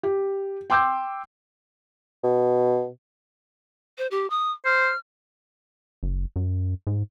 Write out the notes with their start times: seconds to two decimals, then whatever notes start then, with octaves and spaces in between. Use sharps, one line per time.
0.03 G4
0.70 G5 C6 D6 E6 G6
2.24 B2
3.98 C5
4.11 G4
4.30 D#6
4.65 C5 F6
6.03 F#1
6.36 F#2
6.87 G#2